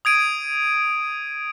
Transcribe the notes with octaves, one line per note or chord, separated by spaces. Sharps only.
D#6 G#6 D7 D#7